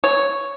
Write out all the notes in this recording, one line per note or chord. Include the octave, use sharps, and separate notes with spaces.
C#5